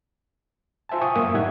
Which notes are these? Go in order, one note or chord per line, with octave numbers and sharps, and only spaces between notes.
F4 C5 E5 G#5 A5
F5 G5 G#5 C#6 D#6
F#2 A#3 A#4 E5 D#6
A2 G3 D#4 E5 F#5 G#6